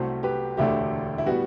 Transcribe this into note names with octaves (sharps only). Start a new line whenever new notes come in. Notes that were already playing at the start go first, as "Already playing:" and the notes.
Already playing: C2 C3 F#3 A3 A4 C5
G4 B4
E1 D2 D3 A3 E4 G4
E4
A2 G3 B3 F#4